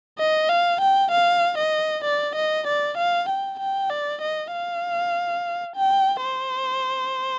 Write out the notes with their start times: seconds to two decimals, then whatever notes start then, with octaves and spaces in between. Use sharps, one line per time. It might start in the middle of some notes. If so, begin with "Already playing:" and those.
0.19 D#5
0.49 F5
0.81 G5
1.12 F5
1.58 D#5
2.05 D5
2.36 D#5
2.67 D5
2.98 F5
3.29 G5
3.60 G5
3.90 D5
4.22 D#5
4.53 F5
5.76 G5
6.23 C5